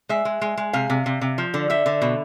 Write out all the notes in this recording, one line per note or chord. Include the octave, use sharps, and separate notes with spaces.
G#3 E5
G#3
G#3
G#3
C3 F5
C3
C3
C3
F3
D3
D3 E5
D3
B2